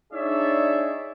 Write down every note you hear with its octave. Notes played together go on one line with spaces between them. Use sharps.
D4 D#4 G#4 C#5 D5 E5